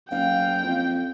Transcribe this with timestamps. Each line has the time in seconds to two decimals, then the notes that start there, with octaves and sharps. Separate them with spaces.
0.11 F#1 F5 G5
0.63 F2